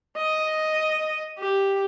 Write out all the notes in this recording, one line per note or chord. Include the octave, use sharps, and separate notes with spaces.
D#5
G4